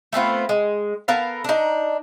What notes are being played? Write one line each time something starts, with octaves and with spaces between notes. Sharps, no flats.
A3 B3 C4 F4
G#3
B3 A4 A#4 F5
D4 D#4